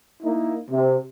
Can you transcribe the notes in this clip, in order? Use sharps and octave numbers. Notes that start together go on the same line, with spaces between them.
A#3 D#4 E4
C3